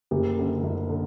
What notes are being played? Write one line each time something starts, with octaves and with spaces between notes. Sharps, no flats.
F#1 G4
F#2 D3
F#1
D3